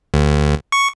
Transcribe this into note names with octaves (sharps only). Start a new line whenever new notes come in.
D2
C#6